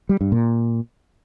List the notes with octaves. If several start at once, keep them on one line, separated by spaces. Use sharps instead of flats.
G3
G2
A#2